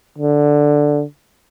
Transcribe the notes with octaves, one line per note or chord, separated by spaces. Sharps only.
D3